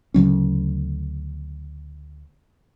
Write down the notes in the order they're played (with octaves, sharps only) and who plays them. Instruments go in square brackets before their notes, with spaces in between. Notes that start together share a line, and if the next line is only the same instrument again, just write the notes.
[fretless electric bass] D2 C#3 F#3 C#4